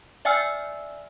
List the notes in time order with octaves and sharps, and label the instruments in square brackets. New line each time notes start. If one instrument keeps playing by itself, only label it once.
[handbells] D5 E5 G5 G#5 E6 F6